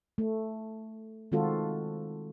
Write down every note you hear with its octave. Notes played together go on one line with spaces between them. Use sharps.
A3
D#3 G#3 C4 F4 F#4 A4